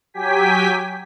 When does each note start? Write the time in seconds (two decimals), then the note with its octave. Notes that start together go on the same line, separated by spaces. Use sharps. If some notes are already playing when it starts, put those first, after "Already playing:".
0.14 F#3 G4 G5 G#5 B6